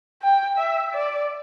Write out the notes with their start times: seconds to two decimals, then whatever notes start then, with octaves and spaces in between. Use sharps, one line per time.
0.23 G5
0.58 E5
0.93 D5